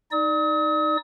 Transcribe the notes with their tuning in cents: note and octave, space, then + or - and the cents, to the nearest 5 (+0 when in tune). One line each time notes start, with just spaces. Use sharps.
D#4 +0 D5 +15 D#6 +40